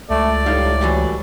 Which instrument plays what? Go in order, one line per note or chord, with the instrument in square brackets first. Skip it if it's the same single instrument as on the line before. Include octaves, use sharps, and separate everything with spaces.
[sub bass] C#2 [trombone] A3 [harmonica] D5
[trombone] A2 [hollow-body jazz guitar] G3 D#4 F5
[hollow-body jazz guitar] E3 F#3 G3